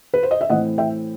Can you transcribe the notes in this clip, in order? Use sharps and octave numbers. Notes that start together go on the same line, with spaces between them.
B4
C5
D#5
E5
A2 E3 A3 C4 D#5 F#5
E5 G5